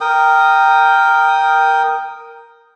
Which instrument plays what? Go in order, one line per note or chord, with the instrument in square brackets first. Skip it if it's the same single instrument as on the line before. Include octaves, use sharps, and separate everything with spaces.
[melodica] A#4 G5 D#6